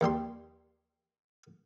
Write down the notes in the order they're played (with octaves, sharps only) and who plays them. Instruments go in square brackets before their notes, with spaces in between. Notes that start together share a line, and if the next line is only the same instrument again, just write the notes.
[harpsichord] D#2 G3 G4 C6